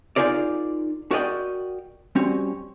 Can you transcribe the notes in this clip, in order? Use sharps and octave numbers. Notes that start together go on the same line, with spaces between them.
D#4 F4 G#4 A#4 D5
F#4 A#4 D5 D#5 G5
G3 C4 C#4 F#4